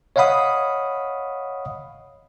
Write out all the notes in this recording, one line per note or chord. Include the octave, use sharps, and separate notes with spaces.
C#5 D#5 F5 F#5 B5 D#6